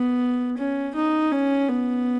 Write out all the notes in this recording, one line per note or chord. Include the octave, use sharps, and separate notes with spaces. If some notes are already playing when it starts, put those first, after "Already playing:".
Already playing: B3
C#4
D#4
C#4
B3